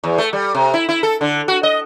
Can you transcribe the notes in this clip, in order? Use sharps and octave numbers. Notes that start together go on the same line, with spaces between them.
E2
A3
G3
C3
E4
E4
A4
D3
F#4
D#5